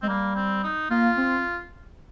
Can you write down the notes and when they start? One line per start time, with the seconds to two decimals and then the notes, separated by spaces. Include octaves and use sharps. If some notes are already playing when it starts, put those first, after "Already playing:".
0.02 G#3 C4
0.08 G3 A#3
0.35 C4
0.63 D#4
0.90 A#3 F4
1.17 C4